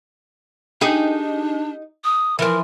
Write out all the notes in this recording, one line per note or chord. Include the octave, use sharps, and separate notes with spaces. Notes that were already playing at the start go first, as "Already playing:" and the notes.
D4 D#4 G4 G#4
D#6
E3 F3 A#4